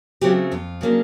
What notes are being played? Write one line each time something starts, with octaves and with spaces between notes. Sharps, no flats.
C#3 F#3 A3 C4 G4
F2 F4
C#3 F#3 A#3 D4